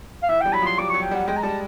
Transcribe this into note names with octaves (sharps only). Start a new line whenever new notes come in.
F5
E3 E5
G3 G5
F#3 B5
F3 C6
G3 D6
F#3 C#6
G5
G3 F#5
G#3 G5
A#5
G3 A5